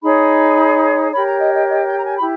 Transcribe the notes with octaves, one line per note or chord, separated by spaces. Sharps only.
D#4 G#4 C#5 B5
G4 A#4 C#5 B5
A#5
D#5
D#5
D#5
G5
A#5
G#5
B5
E4 G4